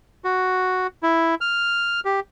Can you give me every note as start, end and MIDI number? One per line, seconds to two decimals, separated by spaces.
0.24 0.87 66
1.03 1.35 64
1.41 2.00 89
2.05 2.20 67